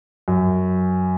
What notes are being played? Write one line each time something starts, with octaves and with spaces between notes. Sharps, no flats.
F#2